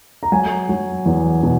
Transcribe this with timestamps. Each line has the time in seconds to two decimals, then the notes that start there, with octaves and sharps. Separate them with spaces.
0.23 A#5
0.32 F#3 G#5
0.69 F#3
1.06 E2
1.43 B2